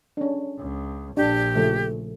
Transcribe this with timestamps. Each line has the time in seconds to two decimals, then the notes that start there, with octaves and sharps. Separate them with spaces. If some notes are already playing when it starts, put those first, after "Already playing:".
0.17 C#4 D4
0.59 C#2
1.17 A#1 D4 G4
1.55 C#3 F3 A3